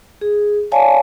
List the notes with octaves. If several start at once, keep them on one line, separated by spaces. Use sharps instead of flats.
G#4
C#5 D5 F5 G#5 A5